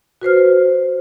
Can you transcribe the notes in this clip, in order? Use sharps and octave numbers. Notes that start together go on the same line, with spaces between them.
F#4 B4 C5 F6